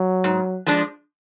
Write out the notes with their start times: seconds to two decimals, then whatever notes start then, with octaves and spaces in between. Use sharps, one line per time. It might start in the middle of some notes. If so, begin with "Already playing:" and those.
Already playing: F#3
0.24 G#2
0.66 F3 G#3 D4